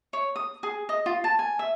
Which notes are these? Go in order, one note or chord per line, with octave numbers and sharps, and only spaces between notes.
C#5
D#6
G#4
D#5
F4
A5
G#5
E5